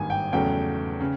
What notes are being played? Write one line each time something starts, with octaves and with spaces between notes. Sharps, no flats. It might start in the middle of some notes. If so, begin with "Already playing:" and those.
Already playing: G#1 G2 D#3 G3 A#3 G#5
G5
E2 C#3 F#3 A3 G5
C#3